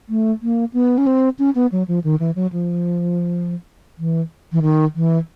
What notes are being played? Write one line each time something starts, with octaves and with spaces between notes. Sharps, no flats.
A3
A#3
B3
C#4
C4
C#4
B3
F#3
F3
D#3
E3
F#3
F3
E3
E3
D#3
E3